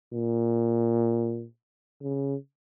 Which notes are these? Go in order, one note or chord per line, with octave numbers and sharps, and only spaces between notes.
A#2
C#3